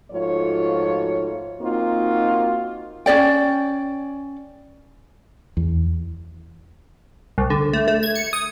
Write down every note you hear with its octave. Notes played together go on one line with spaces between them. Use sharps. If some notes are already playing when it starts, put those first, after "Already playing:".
G#2 F3 A3 F4 F#4 C#5
A#3 C4 D#4 F4 F#4
C#4 G#4 D5 G5
E2
C2
D3
A3
A3
G#6
C#7
D#6